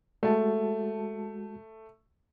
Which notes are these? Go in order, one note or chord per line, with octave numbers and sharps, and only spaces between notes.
G#3 A3 F#4 A5